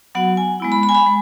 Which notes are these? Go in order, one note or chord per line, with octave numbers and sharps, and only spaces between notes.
F#3 B3 F#4 F#5
G#5
G#3 B3 E4
B5
B5
G#5
B5
G#3